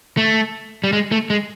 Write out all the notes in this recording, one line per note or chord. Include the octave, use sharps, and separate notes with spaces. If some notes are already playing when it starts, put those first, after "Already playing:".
A3
G3
G#3
A3
G#3